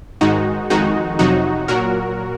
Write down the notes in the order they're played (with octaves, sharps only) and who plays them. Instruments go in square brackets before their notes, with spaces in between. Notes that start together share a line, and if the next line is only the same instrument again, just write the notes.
[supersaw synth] G#2 D#3 G#3 D#4 F#4
F2 D#3 G#3 D#4 F#4
F2 C3 F#3 D#4 F#4
A#2 F#3 F#4 A#4